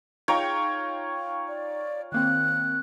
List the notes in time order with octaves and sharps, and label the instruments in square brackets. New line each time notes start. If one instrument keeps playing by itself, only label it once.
[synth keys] D#4 [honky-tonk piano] F4 G5 A#5 [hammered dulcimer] C#5
[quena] D5
[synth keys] D#3 A#3 C4 [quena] F#6